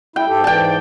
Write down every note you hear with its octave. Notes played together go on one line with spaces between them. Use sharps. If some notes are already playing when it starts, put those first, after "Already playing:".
E4 G5
G#2 G4 A4
G#2 E3 D5 G5 A5